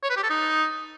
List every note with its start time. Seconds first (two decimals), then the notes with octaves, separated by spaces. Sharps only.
0.03 C#5
0.10 B4
0.16 G4
0.23 A4
0.30 D#4